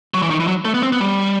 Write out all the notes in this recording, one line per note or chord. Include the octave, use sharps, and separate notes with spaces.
F#3
E3
D#3
E3
F#3
A3
B3
C4
B3
G3